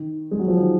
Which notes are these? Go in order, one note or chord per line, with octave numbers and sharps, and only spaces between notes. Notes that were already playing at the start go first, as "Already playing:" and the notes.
Already playing: D#3
G#3
F#3
F3
D#3